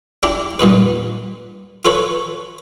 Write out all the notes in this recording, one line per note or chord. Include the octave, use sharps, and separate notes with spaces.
D4 E4 G4
G2 A#2 D#4 B4
F4 A4 B4 C#5